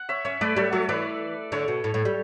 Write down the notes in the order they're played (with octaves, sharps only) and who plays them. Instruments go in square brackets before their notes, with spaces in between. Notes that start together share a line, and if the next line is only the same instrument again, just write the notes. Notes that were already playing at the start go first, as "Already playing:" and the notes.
Already playing: [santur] F#5
C#5 E5
[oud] C#4 [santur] C#5 E5
[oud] A3 [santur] B4 D5
[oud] G3 [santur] A4 C#5
[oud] F#3 [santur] A4 C#5
[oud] E3 [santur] B4 D5
[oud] D3 [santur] A4 C#5
[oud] B2
A2
A2
G3